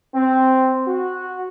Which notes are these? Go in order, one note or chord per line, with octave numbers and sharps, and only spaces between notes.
C4
F#4